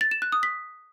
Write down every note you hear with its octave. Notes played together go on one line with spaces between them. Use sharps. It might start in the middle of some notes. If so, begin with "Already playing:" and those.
A6
E7
F#6
D#6
B6